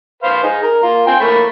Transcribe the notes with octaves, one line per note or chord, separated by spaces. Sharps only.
B4 C5 F5
D#4 G#4
A#4
A#3 F4
C4 G5 G#5
A3 A#3 B5